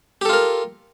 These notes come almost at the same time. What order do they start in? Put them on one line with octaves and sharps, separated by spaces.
G4 A4 F4 A#4